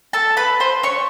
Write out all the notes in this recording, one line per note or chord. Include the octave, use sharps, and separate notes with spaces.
A4 A5
B4 B5
C5 C6
C#5 C#6